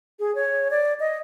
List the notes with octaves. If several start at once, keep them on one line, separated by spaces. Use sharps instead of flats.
G#4
C#5
D5
D#5